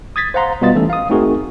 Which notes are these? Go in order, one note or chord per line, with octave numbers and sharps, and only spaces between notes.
D#6 G#6 A6 B6
C5 F5 F#5 A#5 C6
B2 G3 B3 F4 D#5 A6
E3 A3 C#4 A4
F5 D#6
A3 C4 D#4 F#4 G#4 A#4